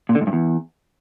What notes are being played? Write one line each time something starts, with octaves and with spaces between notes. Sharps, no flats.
A#2
D3
G#2
G2
E2